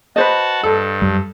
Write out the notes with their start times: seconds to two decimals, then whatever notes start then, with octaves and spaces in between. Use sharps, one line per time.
0.16 F#4 B4 C5 D#5 A5
0.63 G2 A4
1.02 F#2 G3